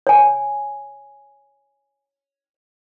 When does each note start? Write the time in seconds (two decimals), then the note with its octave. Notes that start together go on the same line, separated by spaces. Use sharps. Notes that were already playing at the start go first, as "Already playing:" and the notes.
0.07 C#5 G#5